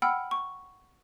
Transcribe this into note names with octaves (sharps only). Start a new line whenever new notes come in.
F#5 G5 B5 E6 F6
C#6